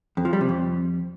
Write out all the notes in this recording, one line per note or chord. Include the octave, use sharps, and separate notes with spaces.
F2
F3
G3
C3
F2